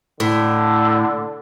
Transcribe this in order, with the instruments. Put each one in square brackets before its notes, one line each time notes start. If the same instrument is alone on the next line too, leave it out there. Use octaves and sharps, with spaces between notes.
[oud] A2 [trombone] D3